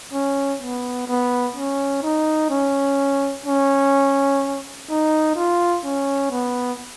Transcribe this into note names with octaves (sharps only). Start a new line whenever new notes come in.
C#4
B3
B3
C#4
D#4
C#4
C#4
D#4
F4
C#4
B3